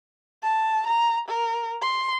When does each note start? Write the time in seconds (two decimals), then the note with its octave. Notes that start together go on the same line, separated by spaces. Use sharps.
0.43 A5
0.87 A#5
1.28 A#4
1.82 C6